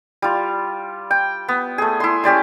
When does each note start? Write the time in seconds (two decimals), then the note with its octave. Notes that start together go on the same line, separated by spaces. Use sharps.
0.22 G3 F4
1.11 G5
1.48 B3
1.78 A3 G#4
2.00 E4 C6
2.24 C#4 G4 D5 C6